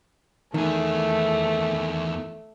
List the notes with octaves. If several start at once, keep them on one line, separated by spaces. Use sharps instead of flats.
E2 D#3 A3 G#4